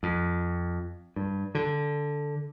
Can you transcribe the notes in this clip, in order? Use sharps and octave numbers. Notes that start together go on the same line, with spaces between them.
F2
G2
D3